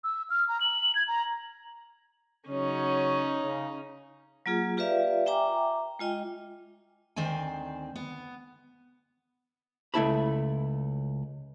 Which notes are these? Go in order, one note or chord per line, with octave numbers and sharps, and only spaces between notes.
E6
F6
A#5
F#7
G#6
A#5
C#3 F#3 C#4 D#4 C#5
C#3
F#3 A#3 F4 G#4
F4 G4 B4 D5 E5 F5
E5 G5 G#5 A#5 D6
G#3 F4 D#5 G5 G#5
D2 D#3 C4 D5 G#5
B3
C#2 A3 B3 E4 A5 B5